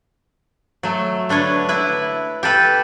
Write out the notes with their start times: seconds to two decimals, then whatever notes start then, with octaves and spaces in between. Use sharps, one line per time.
0.83 F#3 A3
1.29 D3 D4 B4 C#5
1.69 E4 B4
2.43 G4 A4 B4